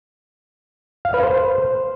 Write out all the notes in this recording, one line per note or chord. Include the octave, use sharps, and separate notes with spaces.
F5
B4
C5